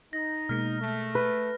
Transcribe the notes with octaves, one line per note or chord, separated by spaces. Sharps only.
D#4 A#6
B2 G#3 A#3 F6
A3
B4